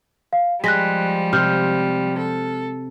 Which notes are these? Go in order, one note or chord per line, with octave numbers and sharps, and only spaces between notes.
F5
F3 G3 G#3 F#6 A#6 B6
C3 F6 G6
A4